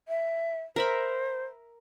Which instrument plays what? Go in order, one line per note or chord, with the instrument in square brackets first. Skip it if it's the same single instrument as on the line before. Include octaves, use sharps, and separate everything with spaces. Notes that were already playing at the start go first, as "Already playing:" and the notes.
[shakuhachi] E5
[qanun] A#4 E5 B5 [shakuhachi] C5